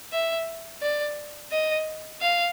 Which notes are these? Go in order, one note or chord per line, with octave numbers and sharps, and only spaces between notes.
E5
D5
D#5
F5